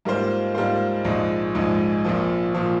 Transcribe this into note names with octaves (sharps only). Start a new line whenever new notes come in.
G#2 G3 A#3 F4 C5
G#2 G3 A#3 F4 C5
A#1 G#2 F3 G#3
A#1 G#2 F3 G#3
A#1 A#2 F3
A#2 F3